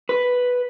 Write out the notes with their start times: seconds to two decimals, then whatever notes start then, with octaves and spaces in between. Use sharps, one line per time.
0.09 B4